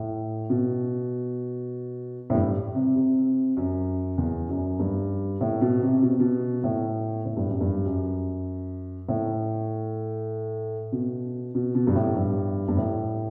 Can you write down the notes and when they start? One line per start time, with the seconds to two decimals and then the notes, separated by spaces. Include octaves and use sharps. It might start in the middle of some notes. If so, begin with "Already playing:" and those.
Already playing: A2
0.50 B2
2.30 A2
2.34 G2
2.75 C3
2.96 C3
3.57 F#2
4.18 E2
4.49 F#2
4.79 G2
5.41 A2
5.61 B2
5.82 C3
6.02 B2
6.10 C3
6.20 B2
6.64 A2
7.25 A2
7.37 G2
7.49 F#2
7.61 G2
7.86 F#2
9.09 A2
10.92 B2
11.55 B2
11.75 B2
11.87 G2
11.95 A2
12.16 G2
12.68 G2
12.77 A2